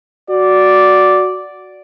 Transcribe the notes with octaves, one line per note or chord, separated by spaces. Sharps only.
F#4 D5